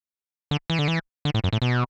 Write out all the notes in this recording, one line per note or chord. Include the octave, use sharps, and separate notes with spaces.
D3
E3
D3
E3
D3
A2
F#2
A2
B2